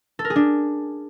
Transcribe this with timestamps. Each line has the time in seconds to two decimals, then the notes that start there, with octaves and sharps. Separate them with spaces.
0.19 A4
0.25 A#4
0.30 G#4
0.36 D4